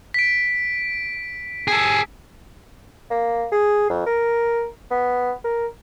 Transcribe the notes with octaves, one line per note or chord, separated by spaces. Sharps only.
B6 D7
G#4 A4
A#3
G#4
F2
A#4
B3
A#4